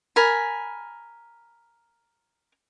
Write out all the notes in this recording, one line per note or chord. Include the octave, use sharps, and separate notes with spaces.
A#4 G#5 B5